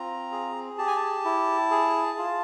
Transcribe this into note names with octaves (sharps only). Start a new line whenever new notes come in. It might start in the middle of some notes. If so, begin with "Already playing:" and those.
Already playing: C4 F4 A#5
G#4
G4 A5
G#5
A5
E4
G#4
F4